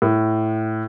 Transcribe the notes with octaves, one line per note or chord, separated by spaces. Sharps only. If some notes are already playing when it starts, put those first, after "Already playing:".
A2